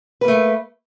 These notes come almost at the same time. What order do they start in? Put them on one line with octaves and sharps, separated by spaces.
B4 A#3 A3